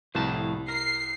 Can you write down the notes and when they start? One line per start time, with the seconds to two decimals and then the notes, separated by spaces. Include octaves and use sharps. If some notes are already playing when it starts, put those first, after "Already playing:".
0.15 C2 F2 A2 A5
0.68 A#4 C7